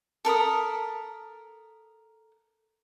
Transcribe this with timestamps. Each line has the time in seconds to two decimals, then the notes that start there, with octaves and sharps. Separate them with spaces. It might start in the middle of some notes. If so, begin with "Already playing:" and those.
0.25 A4 A#4 B5 D#6